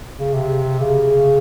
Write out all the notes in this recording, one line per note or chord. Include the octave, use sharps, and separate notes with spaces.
C#3
C3
C#3